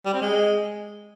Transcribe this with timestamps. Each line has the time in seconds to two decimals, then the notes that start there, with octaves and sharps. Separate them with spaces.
0.06 G3
0.13 C4
0.21 G#3